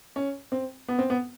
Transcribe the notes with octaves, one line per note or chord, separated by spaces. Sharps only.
C#4
C4
B3
C4
B3